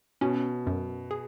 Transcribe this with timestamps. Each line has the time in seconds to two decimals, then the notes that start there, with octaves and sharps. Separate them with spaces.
0.21 B2 C#4
0.67 F#2
1.11 G#4